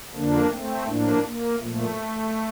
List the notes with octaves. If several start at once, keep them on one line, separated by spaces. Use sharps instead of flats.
F2 D3 F3 A#3 D4
A3 C4
A2 F3 A#3 D4
A#3
A#2 F3 A3